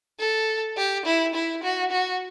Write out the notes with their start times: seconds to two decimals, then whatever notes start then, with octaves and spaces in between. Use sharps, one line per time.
0.19 A4
0.77 G4
1.06 E4
1.35 E4
1.63 F#4
1.92 F#4